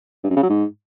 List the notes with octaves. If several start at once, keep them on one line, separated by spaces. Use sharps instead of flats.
G2
F#2
C#3
F#3
G#2